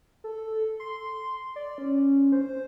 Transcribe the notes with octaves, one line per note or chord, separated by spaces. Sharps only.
A4
C6
D5
C#4
C5